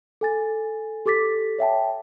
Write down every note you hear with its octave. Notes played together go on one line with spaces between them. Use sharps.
A4 G#5 A6
G4 A4 D6 A6 B6
C#5 E5 G5 A5